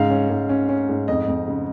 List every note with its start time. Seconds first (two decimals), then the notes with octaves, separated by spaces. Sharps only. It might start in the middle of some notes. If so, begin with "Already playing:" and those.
Already playing: G#2 C#3 F5
0.10 C#4
0.30 G#2
0.49 C#4
0.69 C#4
0.89 G#2
1.08 F2 D#5
1.28 F2
1.48 C#3